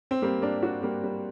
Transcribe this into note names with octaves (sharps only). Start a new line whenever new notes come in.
C4
G3 A#3
A#3 D4
D4 F#4
G3 A#3
G3